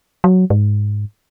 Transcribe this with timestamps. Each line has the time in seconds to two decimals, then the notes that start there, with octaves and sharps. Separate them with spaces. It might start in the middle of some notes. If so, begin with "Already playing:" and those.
0.24 F#3
0.50 G#2